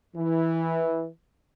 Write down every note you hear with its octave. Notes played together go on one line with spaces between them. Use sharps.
E3